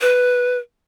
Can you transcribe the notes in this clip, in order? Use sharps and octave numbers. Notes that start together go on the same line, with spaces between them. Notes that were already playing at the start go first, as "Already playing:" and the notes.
B4